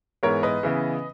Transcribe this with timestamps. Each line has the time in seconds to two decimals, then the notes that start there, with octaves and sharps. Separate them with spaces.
0.23 G#2 E3 G#3 B3 A#4 C#5
0.43 B4 D#5
0.63 C#3 E3 B3